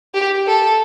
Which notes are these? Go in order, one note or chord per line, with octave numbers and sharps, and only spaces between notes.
G4
A4